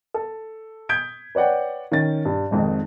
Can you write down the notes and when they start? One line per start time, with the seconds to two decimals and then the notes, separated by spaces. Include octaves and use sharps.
0.14 A4
0.89 D#6 G6 G#6 B6 D7
1.35 B4 C#5 D5 F#5 G5
1.92 D#3 C#4 A6
2.25 G2
2.51 G#1 F2 G#2 D#3